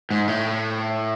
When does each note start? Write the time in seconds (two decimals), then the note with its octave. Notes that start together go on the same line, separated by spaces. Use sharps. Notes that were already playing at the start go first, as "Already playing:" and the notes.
0.11 G#2
0.27 A2